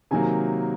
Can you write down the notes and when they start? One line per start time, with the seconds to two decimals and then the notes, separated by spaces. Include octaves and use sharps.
0.11 C3 D#3 F#3 A#3 G#5